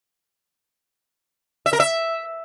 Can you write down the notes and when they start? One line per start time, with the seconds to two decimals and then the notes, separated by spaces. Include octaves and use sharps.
1.66 E5
1.73 A#4
1.80 E5